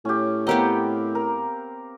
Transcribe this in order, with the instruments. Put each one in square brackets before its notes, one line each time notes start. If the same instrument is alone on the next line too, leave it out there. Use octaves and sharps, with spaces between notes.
[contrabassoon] A2 [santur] C#4 G4
[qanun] B3 G4 D#5 [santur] C4 A#4 F5
[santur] A#4